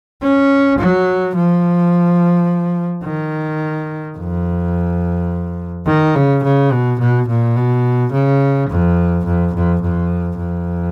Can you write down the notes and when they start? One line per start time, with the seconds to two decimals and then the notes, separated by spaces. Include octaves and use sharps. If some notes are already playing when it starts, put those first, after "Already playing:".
0.22 C#4
0.78 F#3
1.35 F3
3.04 D#3
4.17 F2
5.86 D#3
6.15 C#3
6.43 C#3
6.72 B2
6.99 B2
7.28 A#2
7.56 B2
8.12 C#3
8.69 F2
9.25 F2
9.54 F2
9.82 F2
10.38 F2